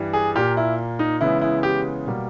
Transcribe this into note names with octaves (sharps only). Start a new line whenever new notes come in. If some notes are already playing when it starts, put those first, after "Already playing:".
Already playing: G2 E3 G3
G#4
A#2 A#3 G4
E4
D#4
C#3 E3 G#3 B3 E4
E4
G4
B2 G3 A#3